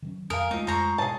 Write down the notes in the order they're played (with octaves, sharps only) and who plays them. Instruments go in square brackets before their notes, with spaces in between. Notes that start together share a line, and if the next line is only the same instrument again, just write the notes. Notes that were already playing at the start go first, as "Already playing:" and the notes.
[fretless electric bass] D#3 F#3 C#4
[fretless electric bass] F2 A#2 F#3 [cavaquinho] A#4 [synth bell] F5 G#5 D#6
[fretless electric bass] D2 [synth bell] G#3 A3 F4 [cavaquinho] D#4
[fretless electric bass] F2 [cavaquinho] C5 A#5 C#6
[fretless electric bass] G#2 B2 [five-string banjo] G#4 A5 [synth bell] C#5